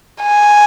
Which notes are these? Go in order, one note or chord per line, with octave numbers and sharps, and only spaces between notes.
G#5